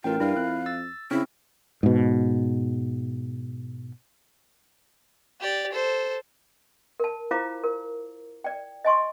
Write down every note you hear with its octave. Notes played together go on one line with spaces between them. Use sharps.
A1 F4 A#4 G5
G2 E4 F5
F2 F#6
E6 A6
C#3 C4 E4
G#2 B2
G4 D5
A4 C5
A#4 A5
E4 F4 C5 F5 A#5 D6
A#4
D5 G5
D#5 G#5 C6 C#6